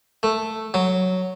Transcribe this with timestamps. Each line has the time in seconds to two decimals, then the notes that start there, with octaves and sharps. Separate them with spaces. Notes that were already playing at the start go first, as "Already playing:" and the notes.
0.23 A3
0.74 F#3